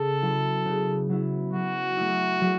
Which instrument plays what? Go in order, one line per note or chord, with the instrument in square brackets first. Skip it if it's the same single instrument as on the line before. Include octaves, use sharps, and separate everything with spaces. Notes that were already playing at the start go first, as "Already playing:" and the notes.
Already playing: [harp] C#3 [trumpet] A4
[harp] F#3 B3 E4
C#3
F#3 B3 E4
[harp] F#3 [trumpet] F#4
[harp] A3 E4
F#3